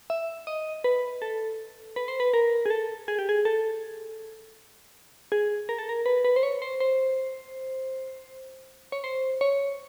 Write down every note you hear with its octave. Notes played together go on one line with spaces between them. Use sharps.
E5
D#5
B4
A4
B4
C5
B4
A#4
G#4
A4
G#4
G4
G#4
A4
G#4
A#4
A4
A#4
B4
B4
C5
C#5
C5
C5
C#5
C5
C#5